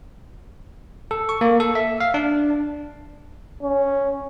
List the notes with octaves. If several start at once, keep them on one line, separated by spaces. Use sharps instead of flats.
A4
C#6
A#3
A4
E5
F5
D4
C#4